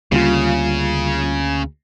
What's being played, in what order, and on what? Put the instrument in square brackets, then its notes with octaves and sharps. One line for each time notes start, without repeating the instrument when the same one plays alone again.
[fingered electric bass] D2 A#3 [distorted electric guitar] C#3 [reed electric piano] G3 F4